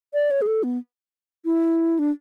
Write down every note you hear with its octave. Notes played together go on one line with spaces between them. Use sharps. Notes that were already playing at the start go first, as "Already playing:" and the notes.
D5
C#5
G#4
A4
B3
E4
D4